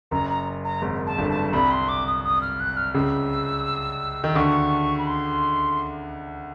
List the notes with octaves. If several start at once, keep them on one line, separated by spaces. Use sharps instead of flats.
F#1 F#2 A#5
A#5
A#5
G#1 G#2
A5
G1 G2
A5
C2 C3 B5
C6
D6
D#6
D#6
F6
F#6
F6
C#2 C#3 E6
D#3
D2 D3 C#6
B5
C6